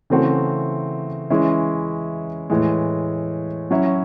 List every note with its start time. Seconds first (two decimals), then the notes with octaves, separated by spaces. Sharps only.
0.10 C#3 E3 A3 C4 F#4
1.30 E3 G#3 C#4 E4
2.50 A2 E3 G#3
3.71 F#3 C#4 E4